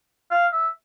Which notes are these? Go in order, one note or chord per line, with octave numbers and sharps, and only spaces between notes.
F5
E5